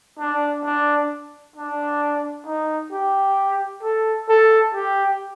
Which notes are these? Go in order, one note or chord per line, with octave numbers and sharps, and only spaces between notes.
D4
D4
D4
D#4
G4
A4
A4
G4